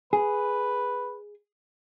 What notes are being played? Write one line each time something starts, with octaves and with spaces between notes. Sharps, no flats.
G#4 B4